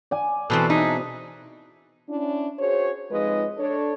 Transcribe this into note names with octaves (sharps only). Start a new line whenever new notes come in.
D5 G#5
B2 E3 C4 A4 B4
D4 D#4 G#4 E5
C#4 D4 E4
F#4 G#4 C5 C#5
F2 G#3 D#4 F4 B4 D#5
D4 A4 C#5